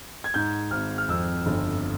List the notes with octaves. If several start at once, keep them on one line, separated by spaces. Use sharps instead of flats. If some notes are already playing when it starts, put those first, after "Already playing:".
G#6
G#2 G6
G#1 F6
F6
F2 E6
G1